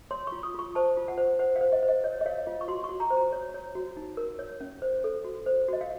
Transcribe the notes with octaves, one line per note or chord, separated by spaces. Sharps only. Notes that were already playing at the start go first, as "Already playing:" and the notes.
C#5 C6
C#6
F4
D#6
F4 C#6
C5 A5
F4
F#5
C5
C5 F#5
F5
C5
D#5
C5
D#5
C#5 D#5
D#5
C#5 F5
F4 D#5
C#6
F#4 C6
C#6
F#4
A#5
C5
A#5
C#5
C#5
F#4
D#4
A#4
C#5
C#4
C5
A4
F#4
C5
F#4 D#5
F5